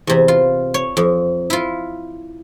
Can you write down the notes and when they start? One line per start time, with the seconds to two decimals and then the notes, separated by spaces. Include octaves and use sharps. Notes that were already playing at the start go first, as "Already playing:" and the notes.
0.07 E2 C3
0.28 F4
0.74 C#5
0.97 F2
1.50 E4 F4